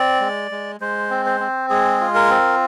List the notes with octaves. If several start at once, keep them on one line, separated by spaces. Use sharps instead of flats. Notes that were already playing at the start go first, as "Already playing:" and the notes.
Already playing: C4 D5
G#3
G#3
G#3 C5
C4
C5
C4
G#3 G#4
F4
A#4
C4